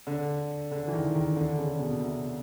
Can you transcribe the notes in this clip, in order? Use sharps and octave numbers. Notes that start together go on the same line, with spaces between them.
D3
D3
E3
D#3
D#3
D3
C#3
B2
C3